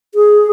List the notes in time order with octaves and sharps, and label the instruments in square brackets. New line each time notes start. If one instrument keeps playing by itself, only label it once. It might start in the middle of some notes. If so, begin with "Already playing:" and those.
[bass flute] G#4